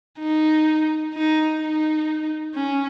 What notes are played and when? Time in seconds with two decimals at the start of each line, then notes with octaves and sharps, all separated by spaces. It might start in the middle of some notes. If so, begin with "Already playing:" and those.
0.19 D#4
1.14 D#4
1.60 D#4
2.54 C#4